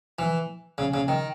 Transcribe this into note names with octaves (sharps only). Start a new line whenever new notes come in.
E3
C#3
C#3
D#3